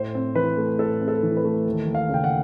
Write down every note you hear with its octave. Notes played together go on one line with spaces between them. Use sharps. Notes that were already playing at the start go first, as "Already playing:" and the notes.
Already playing: A2 C5
C4
E3 B4
A3
A2 A4
C4
A4
E3
B4
A3
D#2
D#2
F5
C#3 G5
F#5